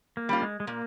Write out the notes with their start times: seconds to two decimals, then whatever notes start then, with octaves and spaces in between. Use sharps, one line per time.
0.17 A#3
0.29 G3 C#4 F4
0.42 G#3
0.60 G#3
0.67 A#2 A#3